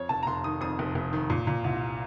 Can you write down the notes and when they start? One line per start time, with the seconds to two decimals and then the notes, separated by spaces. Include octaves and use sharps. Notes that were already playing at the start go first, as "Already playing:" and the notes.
Already playing: F2 C#5
0.09 F1 A5
0.23 A#5
0.27 F1 C6
0.44 D#3 D#6
0.61 F2 D#6
0.79 F1
0.95 F1
1.13 D#3
1.30 A#2
1.47 A#2
1.64 C2